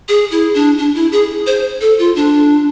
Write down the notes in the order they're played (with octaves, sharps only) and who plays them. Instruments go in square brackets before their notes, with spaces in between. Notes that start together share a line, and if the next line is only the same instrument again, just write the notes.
[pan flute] G#4
E4
D4
D4
E4
G#4
C5
A4
F4
D4